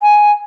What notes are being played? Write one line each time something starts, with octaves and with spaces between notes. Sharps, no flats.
G#5